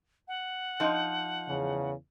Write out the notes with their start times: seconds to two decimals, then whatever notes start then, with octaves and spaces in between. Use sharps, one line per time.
0.28 F#5
0.80 F3 D#4
1.47 E2 C#3